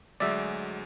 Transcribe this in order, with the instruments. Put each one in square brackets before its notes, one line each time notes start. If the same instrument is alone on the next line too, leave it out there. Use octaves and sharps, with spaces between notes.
[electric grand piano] D2 F#3 G#3 [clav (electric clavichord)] D5 E5